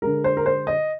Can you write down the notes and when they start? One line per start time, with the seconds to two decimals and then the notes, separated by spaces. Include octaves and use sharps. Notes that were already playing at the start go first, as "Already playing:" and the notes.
0.02 D3 G#3 A#4
0.24 C5
0.37 A#4
0.46 C5
0.67 D#5